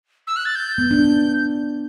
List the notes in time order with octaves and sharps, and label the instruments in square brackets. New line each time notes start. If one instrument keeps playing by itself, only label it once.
[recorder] E6
F#6
A6
G6
[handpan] B3
D4